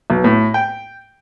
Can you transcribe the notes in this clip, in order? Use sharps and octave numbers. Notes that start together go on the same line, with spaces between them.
B1
A2
G5